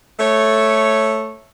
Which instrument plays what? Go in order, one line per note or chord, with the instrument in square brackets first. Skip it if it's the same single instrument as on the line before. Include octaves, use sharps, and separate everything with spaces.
[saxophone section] A3 C#5